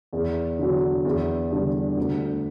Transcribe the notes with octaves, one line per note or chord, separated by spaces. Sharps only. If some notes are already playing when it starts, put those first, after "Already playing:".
E2
D3 F#3
E2
D3 G3 D4
D2